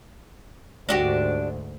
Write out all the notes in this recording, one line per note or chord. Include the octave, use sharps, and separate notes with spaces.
D2 G#2 D4 F#4 G4